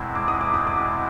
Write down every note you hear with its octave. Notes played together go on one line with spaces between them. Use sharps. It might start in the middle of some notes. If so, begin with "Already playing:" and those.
Already playing: E2 B2 G#3 C4 E4
D6
D#6
D6
D#6
D6